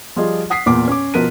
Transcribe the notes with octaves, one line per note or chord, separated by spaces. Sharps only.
F3 G3 F4 G#4 D#5
F#5 D#6 B6 C7
E2 A#2 D6
C#4 D6
B2 F3 A#4 F#6 B6 D#7